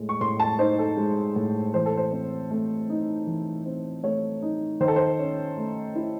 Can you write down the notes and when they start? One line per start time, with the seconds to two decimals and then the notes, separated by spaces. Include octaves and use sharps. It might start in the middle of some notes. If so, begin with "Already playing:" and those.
Already playing: A2 G#3
0.09 C#6
0.21 A2 C6
0.40 A5
0.59 D#4 C5
0.79 A4
0.97 G#3
1.36 A2
1.74 E3 C5
1.86 A4
1.97 C5
2.12 C4
2.51 A3
2.90 D#4
3.27 E3
3.66 C4
4.04 A3 C#5
4.42 D#4
4.80 D#3 C5
4.88 A4
4.96 C5
5.19 C#4
5.57 A3
5.96 E4